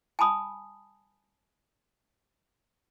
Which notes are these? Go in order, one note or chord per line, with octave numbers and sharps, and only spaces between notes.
G#5 A5 B5 D#6